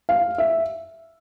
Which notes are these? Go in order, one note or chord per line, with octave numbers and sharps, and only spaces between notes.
F5
E5